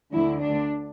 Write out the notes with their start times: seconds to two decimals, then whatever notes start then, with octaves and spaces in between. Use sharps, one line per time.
0.13 D2 D3 E4
0.41 D4